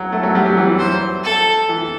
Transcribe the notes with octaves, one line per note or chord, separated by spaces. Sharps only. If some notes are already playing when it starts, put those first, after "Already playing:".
Already playing: F#3
A3
F#3
G3
F#3
E3
F#3
C5
A4
E3